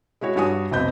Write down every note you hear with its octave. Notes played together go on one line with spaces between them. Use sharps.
G#3 E4 F#4 C#5
G2 G3 F#4 C#5 G#5 D#6
F1 B1 C4 D#5 B5 G6